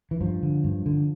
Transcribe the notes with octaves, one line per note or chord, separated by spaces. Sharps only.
E3
G2 F3
D3
G2
D3